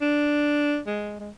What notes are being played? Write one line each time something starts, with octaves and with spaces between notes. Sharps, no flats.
D4
G#3
G#3